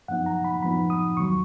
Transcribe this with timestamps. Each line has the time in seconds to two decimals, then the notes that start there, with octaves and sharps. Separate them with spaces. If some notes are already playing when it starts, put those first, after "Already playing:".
0.08 F#2 F3 B3 D#4 F#5
0.26 A#5
0.44 B5
0.63 F#2 F3 B3 D#4 B5
0.90 D#6
1.17 D#2 D#3 F#3 C#6